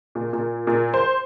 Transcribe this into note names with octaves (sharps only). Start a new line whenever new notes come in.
A#2
A#2
A#2
C5